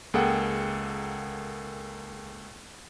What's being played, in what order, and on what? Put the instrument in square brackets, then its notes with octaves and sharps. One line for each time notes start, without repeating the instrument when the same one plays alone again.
[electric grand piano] C#2 A#3 G#4 A4 F#5 G5